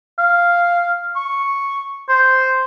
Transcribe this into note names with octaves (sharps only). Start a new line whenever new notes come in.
F5
C#6
C5